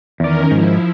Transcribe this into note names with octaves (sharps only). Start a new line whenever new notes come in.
E2 D#3 C#4 A#4 D5
G#2 F3 E4